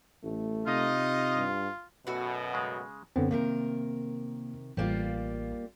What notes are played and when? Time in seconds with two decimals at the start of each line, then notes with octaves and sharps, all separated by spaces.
0.24 A1 A3
0.67 C3 D#4 F4 D#5
1.35 G2
2.07 F#2 B2 A3 F#4 B4
2.53 C#3 G#3
3.16 F#2 D3 B3 C4
3.31 C3 D#3 A#3 A#4
4.77 A1 G3 A#3 F4